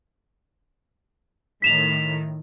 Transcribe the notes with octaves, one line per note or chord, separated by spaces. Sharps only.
A2 D#3 B6 E7 F7